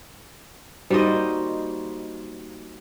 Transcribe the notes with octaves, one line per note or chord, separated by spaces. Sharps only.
G3 A#3 D#4 F#4 C5 D#5